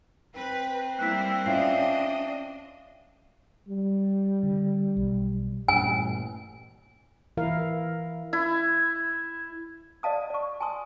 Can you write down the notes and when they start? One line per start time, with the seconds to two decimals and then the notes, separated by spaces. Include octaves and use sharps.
0.35 C4 B4
0.99 G3 A#3 E4 F#6 B6
1.46 C#4 D4 F4 D#5 E5 C7
3.67 G3
4.43 D3
4.97 B1
5.68 A1 G2 A#2 G#5
7.37 E3 E4 A#4 F5
8.33 E4
10.03 D5 D#5 F5 A5 D#6
10.30 D5 C#6
10.60 G#5 A5 C6 D#6